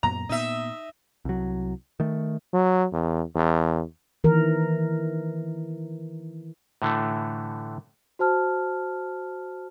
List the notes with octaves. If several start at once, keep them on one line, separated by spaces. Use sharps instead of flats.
F#2 A#2 B3 A#5
A#2 B3 D#4 E5
C2 F#3
D#3 A3
F#3
E2
E2
D#3 E3 A#4
A2 D3 E3 A3
F#4 C5 A5 F6